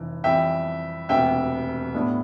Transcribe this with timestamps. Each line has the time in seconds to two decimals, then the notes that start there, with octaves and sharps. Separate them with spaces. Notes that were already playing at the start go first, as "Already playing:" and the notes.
Already playing: F1 E3
0.24 F2 E3 G3 E5 G5
1.09 E1 D2 C3 E5 G5
1.94 A2 G3 B3 D4